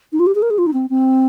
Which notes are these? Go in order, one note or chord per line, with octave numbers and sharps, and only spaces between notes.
D#4
F4
G4
G#4
A#4
G#4
F4
D#4
C4
C4